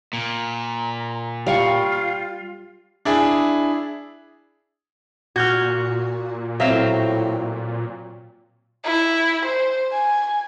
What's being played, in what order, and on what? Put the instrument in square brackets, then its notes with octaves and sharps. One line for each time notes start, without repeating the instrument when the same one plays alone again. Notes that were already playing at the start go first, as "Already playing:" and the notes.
[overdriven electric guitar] A#2
[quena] A#5
[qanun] G3 C#6 [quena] F4 [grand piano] F5 G5
[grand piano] D4 E4 G#4
[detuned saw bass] A#2 [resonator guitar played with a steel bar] F#4 [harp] F6 G6 G#6
[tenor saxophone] A2 [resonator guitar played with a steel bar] F#3 C4 [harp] E5 F5
[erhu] E4
C5
G#5